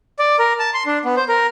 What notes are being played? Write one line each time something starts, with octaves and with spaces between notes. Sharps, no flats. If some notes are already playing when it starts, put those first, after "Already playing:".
D5
A#4
A5
C6
D4
B3
C5
A#4